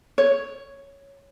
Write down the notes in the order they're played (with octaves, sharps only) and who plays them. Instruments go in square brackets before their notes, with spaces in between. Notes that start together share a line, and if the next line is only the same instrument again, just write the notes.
[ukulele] C#5